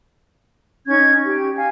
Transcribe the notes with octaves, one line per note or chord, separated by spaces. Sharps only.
C#4 D#4 C#6 G#6
G4
F5 G#5